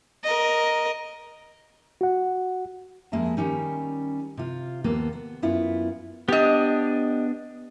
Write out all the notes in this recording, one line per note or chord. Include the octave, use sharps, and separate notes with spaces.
A#4 D#5
F#4 F#5
F2 G#3 A#3 G#4 E5 A5
D#3 G3 C#4 D#4
C3 F4
D#2 A#3 B3 A4
B3
F#2 B3 E4 F4
B3 D4 G4 D#5